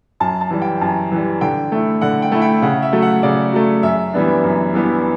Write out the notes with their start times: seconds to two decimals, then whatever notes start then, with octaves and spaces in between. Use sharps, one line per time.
0.20 F#2 A5
0.41 A5
0.50 E3 G3
0.62 G5
0.81 F#2 A5
1.12 E3 G3
1.41 D3 G5
1.72 A3 E4
2.01 D3 F#5
2.22 G5
2.32 A3 E4
2.42 G5
2.62 C#3 F#5
2.82 E5
2.92 F#3 A3
3.02 F#5
3.23 C#3 D5
3.53 F#3 A3
3.83 F#2 E5
4.14 E3 G3 B3 D4
4.44 F#2
4.74 E3 G3 B3 D4